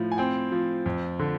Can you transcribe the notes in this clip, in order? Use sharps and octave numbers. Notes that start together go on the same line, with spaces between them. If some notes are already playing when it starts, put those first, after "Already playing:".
Already playing: A2 F3
G#5
C4 G5
F3
F2
D3